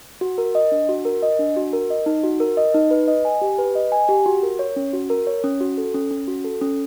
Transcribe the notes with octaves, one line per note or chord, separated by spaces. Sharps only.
F#4
A#4
D#5
D4
F#4
A#4
D#5
D4
F#4
A#4
D#5
D#4
F#4
A#4
D#5
D#4
B4
D#5
G#5
G4
B4
D#5
G#5
G4
F#4
A#4
C#5
C#4
F#4
A#4
C#5
C#4
F#4
A4
C#4
C#4
F#4
A4
C#4